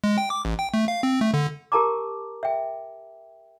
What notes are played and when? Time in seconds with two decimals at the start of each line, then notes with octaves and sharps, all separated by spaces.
0.04 G#3
0.18 G5
0.30 D6
0.45 A1
0.59 G5
0.74 A3
0.88 F5
1.03 C4
1.21 A3
1.34 D3
1.72 G4 A#4 A5 A#5 D6
2.43 E5 G5